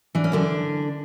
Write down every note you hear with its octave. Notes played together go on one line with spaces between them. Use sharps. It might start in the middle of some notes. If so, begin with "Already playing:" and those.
E3 D4
C#4
F#2 D3 D4